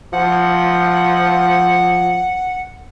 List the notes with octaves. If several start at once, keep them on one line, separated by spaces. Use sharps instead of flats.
F3 F#5